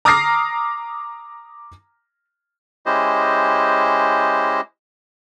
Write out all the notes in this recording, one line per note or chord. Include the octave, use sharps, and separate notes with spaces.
A#5 D6 D#6 F6 A#6 C7
G#3 C#4 E4 G4 C5 D#5